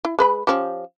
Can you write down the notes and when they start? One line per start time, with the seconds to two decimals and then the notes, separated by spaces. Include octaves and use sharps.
0.05 E4
0.19 G#3 B4 B5
0.47 F3 C#4 G4